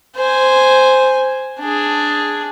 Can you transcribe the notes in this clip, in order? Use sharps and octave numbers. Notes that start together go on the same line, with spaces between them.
C5 G#5
D4 G#4